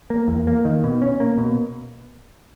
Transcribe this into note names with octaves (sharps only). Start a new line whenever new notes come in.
A#3
E2
A#3
D#3
B2
C#4
A#3
B2